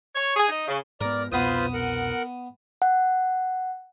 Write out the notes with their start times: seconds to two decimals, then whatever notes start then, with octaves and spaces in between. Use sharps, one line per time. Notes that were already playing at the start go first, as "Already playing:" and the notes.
0.15 C#5
0.36 G#4
0.48 D#4
0.67 C#3
1.01 G#2 B3 A#4 D5
1.32 C2 F2 B2 B3 F4 B4 C5 D#6
1.74 A#4 F#5
2.82 F#5